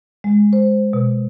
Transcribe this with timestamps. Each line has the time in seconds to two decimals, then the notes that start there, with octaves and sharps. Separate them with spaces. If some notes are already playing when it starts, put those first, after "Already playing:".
0.24 G#3
0.53 C5
0.93 B2